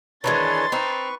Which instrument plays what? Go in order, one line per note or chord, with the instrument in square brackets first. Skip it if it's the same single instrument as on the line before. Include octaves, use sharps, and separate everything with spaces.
[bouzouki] D#3 E3 G#3 [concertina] D4 B4 C#5 [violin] C6 A6
[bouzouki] C4 D#4 [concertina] B4 C#6